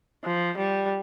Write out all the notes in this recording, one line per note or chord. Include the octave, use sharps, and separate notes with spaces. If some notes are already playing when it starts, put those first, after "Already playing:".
F3
G3